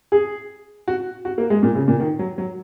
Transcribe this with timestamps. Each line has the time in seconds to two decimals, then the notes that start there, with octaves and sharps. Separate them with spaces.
0.12 G#4
0.88 F#4
1.25 F#4
1.38 A#3
1.50 G#3
1.63 A#2
1.75 C#3
1.88 A#2
2.00 D#3
2.19 F#3
2.38 F#3